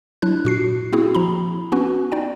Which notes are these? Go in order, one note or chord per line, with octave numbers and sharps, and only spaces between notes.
F#3 D4 E4 F#6
A#2 F#4 C7
A#3 C4 E4 F#4 G#4
F3 A#5 B5
B3 C#4 F#4 B4
D#4 D5 G5